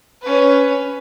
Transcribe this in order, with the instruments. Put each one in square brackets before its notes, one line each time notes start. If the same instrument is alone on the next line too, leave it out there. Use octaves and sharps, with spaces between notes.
[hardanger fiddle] C#4 B4